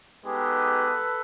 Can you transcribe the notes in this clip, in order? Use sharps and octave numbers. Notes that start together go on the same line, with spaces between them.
G#3 B3 D#4 G4 A4 B4